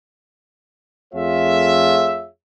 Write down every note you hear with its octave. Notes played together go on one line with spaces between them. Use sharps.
F2 A3 F4 G#4 C#5 E5